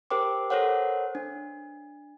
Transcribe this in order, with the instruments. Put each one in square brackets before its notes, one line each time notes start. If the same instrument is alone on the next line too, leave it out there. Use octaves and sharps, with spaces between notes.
[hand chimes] G4 A#4 C5 G5 D6
A4 A#4 C5 C#5 F#5
D4